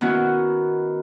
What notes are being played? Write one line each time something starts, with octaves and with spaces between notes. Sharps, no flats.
D#3 B3 C#4 E4 F#4